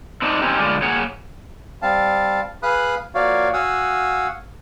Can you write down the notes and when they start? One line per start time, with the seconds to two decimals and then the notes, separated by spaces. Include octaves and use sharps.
0.22 C4 D4 D#4
0.42 C4 C#4 D#4 G4
0.59 D3 G#3 D4 F4
0.82 A#3 G#4 C#5 F#5
1.82 G3 C4 F5 A5
2.63 G#4 B4 F5 B5 D#6 F#6
3.15 F3 A#3 F#4 C#5 D5 F5
3.53 F#4 F5 F#5 G#5 D#6 E6